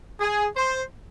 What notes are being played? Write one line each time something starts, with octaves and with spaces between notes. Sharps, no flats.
G#4
C5